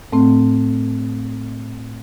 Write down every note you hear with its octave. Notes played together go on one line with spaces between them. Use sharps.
A2 A3 C4